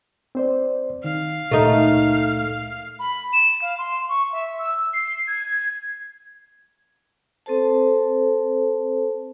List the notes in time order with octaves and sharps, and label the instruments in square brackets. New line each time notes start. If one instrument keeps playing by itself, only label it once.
[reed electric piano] C4 C5 D5
[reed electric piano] D#3 [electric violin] F5
[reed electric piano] C#2 A#2 A#4 [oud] A3 D#4
[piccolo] B5
E7
F5
C6
C#6
E5
E6
C7
G#6
[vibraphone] C4 A4 C5 A5